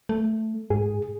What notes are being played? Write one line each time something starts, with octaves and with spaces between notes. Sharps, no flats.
A3
G#2 G#4